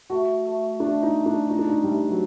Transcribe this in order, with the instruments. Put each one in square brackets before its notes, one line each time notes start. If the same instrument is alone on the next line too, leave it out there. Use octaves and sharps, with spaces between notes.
[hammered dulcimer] A3 [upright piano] F#4
[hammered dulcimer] A3
[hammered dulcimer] A3 [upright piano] D4
[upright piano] D#4
[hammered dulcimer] A3
[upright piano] D4
[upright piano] D#4 [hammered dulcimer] F#4
[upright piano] D4
D#4
[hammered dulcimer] C3 [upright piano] G3
[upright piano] F#3